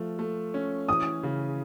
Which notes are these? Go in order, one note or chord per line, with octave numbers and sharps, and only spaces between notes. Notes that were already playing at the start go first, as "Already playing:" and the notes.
Already playing: F3 A3
A3
C#4
E3 D#6
C#3